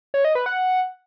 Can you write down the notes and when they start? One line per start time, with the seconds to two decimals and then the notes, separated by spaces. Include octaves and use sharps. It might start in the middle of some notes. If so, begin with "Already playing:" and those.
0.14 C#5
0.25 D#5
0.35 B4
0.46 F#5